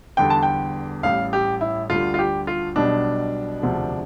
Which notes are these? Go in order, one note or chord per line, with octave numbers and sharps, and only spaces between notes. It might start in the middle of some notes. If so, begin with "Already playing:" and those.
E2 D3 G3 G5
A5
G5
A1 A2 G3 F5
G4
E4
D2 D3 G3 F4
F4
G4
F4
B1 B2 G3 D4
E1 D2 C3 F3